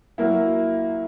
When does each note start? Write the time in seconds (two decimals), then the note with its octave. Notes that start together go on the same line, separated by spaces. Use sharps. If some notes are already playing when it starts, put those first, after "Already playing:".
0.18 F#3 A#3 E4